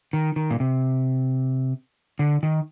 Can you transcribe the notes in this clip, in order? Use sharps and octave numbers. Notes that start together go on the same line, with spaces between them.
D#3
D#3
A#2
C3
D3
D#3